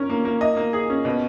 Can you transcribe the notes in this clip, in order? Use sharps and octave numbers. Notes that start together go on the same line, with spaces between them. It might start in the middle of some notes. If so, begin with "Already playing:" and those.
Already playing: C#4 A#4
A#3
A#3
D#5
A#3
G#4
C#4
B2